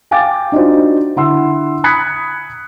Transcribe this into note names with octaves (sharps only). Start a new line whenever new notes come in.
F5 G5 G#5 D6 A6
D4 D#4 F4 F#4 C5
D3 E4 F#5 C6 E6
B5 D#6 F#6 G#6 B6 C#7